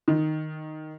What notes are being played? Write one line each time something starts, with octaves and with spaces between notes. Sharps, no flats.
D#3